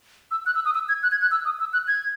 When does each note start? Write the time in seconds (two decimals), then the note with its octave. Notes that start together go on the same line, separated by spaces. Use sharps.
0.31 E6
0.46 F#6
0.55 E6
0.65 D#6
0.74 E6
0.89 G#6
1.03 F#6
1.12 G#6
1.22 F#6
1.31 E6
1.45 D#6
1.60 E6
1.73 F#6
1.88 G#6